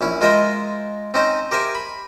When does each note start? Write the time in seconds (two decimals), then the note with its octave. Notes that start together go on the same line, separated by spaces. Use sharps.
0.01 A#1 C#4 E4
0.21 G#3 F4 A#4 C5 D#5 E5
1.14 C4 C#4 D#4 C5
1.51 G4 A#4 C5 E5 G#5
1.75 B5